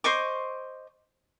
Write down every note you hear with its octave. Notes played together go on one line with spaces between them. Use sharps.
C5 D#5 C#6 D6